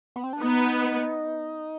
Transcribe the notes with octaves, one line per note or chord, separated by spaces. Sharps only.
B3
C4
D4
B3 D#4